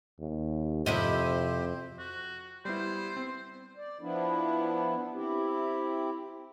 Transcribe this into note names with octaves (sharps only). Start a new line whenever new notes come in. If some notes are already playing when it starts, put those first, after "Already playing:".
D#2
F2 C3 C4 E4 G4 C5 D#5
F#4
G3 B3 E4 C5
C4
D5
F3 B3 D4 E4
C4 E4 G4